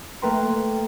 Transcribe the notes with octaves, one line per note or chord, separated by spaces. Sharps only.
A3 A#3 B4 G5 A#5 C6